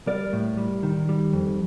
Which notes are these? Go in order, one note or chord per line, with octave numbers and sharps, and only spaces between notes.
G3 A#4 D5
A2
G3
D#3
G3
F2